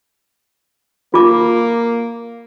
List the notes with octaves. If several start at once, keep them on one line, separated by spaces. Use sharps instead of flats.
A#3 F4 D6